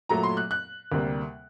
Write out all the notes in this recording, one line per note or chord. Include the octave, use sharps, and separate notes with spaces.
A#2 F#3 A3 A#5
C6
F#6
F#6
D2 C3 G3 A#3